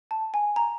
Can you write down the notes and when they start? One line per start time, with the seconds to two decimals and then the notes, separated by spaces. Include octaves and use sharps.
0.11 A5
0.34 G#5
0.56 A#5